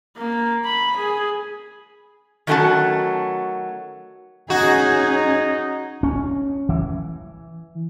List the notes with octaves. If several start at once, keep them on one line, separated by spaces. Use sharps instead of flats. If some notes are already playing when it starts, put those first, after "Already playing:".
A#3
B5
G#4
D#3 F#3 A3 C#4 F#4 A5
C#4 D#4 F#4 G#4
C#4
E3